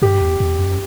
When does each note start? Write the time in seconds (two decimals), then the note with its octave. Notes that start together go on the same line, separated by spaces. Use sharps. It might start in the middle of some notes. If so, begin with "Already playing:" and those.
0.02 G2 G4
0.21 E2
0.40 E2
0.58 F#2